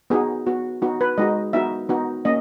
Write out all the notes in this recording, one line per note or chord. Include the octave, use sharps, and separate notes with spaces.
B3 D#4 F#4 G#4
B3 F#4
B3 D#4 F#4
B4
G#3 D#4 F#4 D#5
B3 D#4 F#4 E5
B3 D#4 F#4
A#3 C#4 D#5